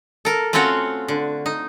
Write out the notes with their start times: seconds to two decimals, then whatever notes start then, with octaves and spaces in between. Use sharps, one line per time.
0.25 A4 A#4
0.53 A3 C4 C#4 F4 F#4 C#5
1.08 D3
1.46 D#4